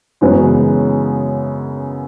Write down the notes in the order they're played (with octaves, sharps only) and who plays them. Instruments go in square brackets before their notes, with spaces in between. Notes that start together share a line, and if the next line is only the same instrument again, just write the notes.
[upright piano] F#2 C#3 E3 G#3 B3